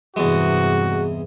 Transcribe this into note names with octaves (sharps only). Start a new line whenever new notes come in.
E2 G2 C3 G#3 F#4